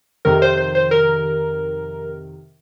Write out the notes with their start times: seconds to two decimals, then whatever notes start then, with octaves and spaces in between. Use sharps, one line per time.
0.25 F2 C3 D#3 A#4
0.42 C5
0.57 C5
0.75 C5
0.91 A#4